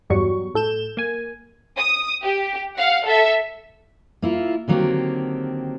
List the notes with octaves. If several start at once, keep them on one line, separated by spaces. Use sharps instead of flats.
E2 G2 F#3 G3 C#6
A2 A4 G6 E7
A#3 G#5
D#6
G4
F5 F#5
A4 E5
A#3 E4 F4
D3 D#3 F#3 A#3 C4 G4